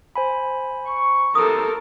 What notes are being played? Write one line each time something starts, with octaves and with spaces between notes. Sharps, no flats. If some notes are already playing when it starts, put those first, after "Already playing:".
C5 G#5 B5
C#6
C3 A4 A#4 D#6